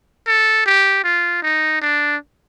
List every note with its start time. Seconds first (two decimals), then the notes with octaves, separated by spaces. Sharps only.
0.27 A4
0.66 G4
1.04 F4
1.43 D#4
1.81 D4